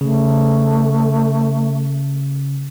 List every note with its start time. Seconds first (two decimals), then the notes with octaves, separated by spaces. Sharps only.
0.01 C#3 A3